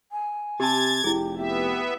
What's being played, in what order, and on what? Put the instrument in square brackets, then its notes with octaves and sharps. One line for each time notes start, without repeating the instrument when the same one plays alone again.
[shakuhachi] G#5
[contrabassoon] C3 [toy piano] G4 A5 [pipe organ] G#6 A6
[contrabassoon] F1 [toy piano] E4 G#4 [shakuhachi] G4
[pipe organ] B3 E5 [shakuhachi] G4